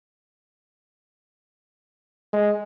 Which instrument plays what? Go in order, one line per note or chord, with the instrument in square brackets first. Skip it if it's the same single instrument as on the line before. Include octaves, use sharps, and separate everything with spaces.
[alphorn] G#3